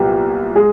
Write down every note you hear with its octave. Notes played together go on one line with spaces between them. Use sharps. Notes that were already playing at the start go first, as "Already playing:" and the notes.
Already playing: C2 A#2 F#3 B3 G4
G#3 G#4